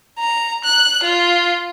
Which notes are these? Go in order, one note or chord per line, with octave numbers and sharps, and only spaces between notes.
A#5
F#6
F4